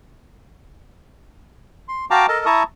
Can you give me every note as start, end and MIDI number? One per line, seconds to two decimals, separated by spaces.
1.89 2.05 84
2.11 2.26 66
2.11 2.26 77
2.11 2.26 79
2.11 2.26 81
2.11 2.26 82
2.11 2.26 86
2.28 2.46 69
2.28 2.46 70
2.28 2.46 75
2.28 2.46 81
2.46 2.63 64
2.46 2.63 76
2.46 2.63 81
2.46 2.63 82
2.46 2.63 85
2.46 2.63 87